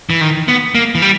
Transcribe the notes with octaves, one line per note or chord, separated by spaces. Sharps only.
E3
D#3
B3
A#3
E3
G3